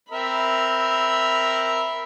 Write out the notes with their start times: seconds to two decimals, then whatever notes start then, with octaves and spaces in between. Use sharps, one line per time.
0.11 C4 A#4 E5 B5